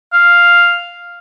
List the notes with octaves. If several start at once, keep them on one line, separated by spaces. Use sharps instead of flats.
F5